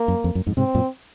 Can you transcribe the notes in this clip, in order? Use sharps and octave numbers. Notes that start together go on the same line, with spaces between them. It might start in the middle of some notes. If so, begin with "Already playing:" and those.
Already playing: A#3
F#2
F2
F#2
F2 G#2
G#2 C3 C4
F#2 A#2